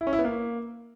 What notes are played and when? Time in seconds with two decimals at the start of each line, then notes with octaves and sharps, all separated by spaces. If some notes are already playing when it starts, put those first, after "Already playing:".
0.01 E4
0.07 C#4
0.13 E4
0.19 B3
0.25 A#3